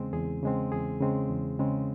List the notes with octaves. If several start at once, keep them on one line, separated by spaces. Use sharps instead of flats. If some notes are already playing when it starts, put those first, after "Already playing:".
Already playing: E2 C#3 G#3 C4
E2 G#4
C#3 G#3 C4
E2 G#4
C#3 G#3 C4
E2
C#3 G#3 C4